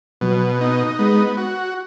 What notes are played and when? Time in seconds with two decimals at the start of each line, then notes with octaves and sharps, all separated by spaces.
0.21 B2 F#3
0.60 B3 D#4
0.99 G#3 B3
1.37 F#4